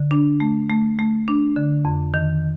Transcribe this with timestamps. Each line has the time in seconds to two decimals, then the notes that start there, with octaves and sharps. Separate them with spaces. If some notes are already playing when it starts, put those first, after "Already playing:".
Already playing: D3
0.11 D4
0.40 A3
0.70 A3
0.99 A3
1.28 D4
1.56 D3
1.85 F2
2.14 D#3